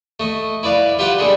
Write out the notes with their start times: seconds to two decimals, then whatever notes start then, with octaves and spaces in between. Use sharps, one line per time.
0.20 A3 D#5
0.63 E4 B4 D5 F5
0.99 F4 G4 B4 E5 F#5 G5
1.19 G3 G#3 D4 G#4 A4